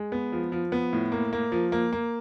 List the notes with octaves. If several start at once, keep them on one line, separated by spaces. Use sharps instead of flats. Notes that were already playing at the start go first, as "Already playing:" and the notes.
Already playing: G#3
B3
F3
F3
B3
A2
A#3
A#3
F3
A#3
A#3